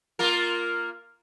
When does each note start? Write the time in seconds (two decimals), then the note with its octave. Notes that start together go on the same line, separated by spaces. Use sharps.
0.19 A#3 F4 A#4